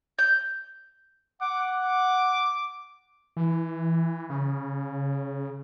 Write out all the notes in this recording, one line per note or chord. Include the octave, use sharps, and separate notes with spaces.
G6
F#5 D6
D6
E3
C#3